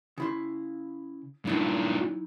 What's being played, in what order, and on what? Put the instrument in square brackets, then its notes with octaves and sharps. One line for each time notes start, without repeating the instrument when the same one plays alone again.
[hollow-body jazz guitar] C#3 E4 C6
[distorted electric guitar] G2 A#2 [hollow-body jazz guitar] F#3 D#4 E4